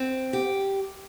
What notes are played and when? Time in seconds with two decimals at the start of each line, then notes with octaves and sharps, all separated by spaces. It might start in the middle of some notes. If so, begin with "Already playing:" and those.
Already playing: C4
0.33 G4